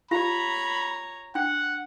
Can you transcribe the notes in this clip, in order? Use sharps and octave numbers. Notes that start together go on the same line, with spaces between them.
F4 G4 C#5 F5 A#5 B5
D4 F#5 G5